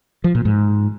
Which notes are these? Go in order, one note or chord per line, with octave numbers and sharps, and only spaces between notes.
F3
A#2
G#2